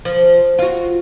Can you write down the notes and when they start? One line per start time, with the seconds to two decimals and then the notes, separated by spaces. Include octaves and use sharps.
0.05 F3
0.59 F4 F#4